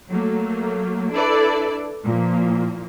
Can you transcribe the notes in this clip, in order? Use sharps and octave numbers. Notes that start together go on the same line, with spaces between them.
F#3 A3 A#3
D4 E4 A4 B4 D5
A#2 E3 F3 A#3